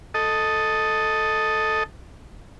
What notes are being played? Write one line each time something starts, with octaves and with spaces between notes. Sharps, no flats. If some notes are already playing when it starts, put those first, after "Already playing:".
A4 D#5